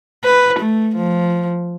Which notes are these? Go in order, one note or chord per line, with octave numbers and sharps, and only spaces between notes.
B4
A3
F3